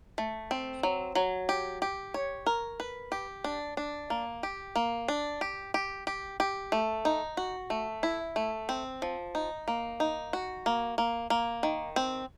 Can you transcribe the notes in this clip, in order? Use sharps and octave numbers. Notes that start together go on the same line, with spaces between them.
A3
C4
F#3
F#3
G4
G4
C#5
A#4
B4
G4
D4
D4
A#3
G4
A#3
D4
G4
G4
G4
G4
A3
D#4
F#4
A3
E4
A3
C4
F3
D#4
A#3
D#4
F#4
A#3
A#3
A#3
D#3
C4